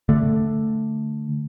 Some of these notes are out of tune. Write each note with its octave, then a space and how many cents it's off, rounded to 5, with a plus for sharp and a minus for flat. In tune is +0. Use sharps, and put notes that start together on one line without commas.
D3 +0 A3 +0